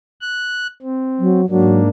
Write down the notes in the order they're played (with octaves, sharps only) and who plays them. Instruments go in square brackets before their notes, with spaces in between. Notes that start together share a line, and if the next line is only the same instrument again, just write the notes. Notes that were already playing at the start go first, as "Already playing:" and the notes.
[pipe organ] F#6
C4
[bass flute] F#3
[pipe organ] G#2 A#3 D4 [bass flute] F#3